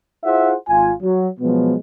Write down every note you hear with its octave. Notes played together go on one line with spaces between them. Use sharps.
E4 F4 G#4 C5 E5 F#5
G#1 F4 G#5
F#3
B2 F3 F#3 G#3 B3